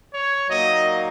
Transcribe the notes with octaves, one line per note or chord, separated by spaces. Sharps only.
C#5
A#2 F#3 A#3 D#4 D#5